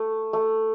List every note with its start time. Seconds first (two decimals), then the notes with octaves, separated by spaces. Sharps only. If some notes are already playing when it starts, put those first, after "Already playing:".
Already playing: A3
0.33 A3